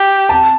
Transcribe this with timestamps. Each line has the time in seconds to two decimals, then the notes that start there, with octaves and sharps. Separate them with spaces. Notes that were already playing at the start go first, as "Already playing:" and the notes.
Already playing: G4
0.29 A5